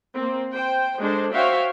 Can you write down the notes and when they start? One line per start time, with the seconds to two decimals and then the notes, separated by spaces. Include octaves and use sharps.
0.14 A#3 C4
0.53 C5 G5
1.00 G#3 D4 A4 C5
1.32 F#4 C5 C#5 E5 F5 G5